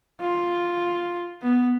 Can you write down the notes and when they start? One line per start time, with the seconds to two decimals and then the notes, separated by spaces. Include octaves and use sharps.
0.21 F4
1.42 B3